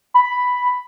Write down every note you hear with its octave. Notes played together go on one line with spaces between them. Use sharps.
B5